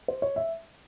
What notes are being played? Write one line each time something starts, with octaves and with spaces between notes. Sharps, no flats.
C5
C#5
E5